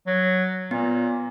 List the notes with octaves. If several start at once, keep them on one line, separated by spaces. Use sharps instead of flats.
F#3
A#2 B3